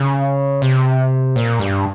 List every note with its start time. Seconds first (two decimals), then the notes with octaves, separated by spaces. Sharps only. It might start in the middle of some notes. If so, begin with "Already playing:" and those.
Already playing: C#3
0.62 C3
1.36 A#2
1.59 G2